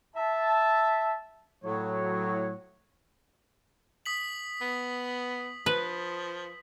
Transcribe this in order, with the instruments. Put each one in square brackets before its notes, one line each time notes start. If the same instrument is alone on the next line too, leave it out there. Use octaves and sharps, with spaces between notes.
[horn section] E5 A5
A2 F#3 C#5
[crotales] D#6 B6 F#7
[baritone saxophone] B3
[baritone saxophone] F3 [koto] B4